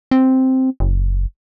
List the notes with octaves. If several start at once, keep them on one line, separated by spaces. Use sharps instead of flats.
C4
F#1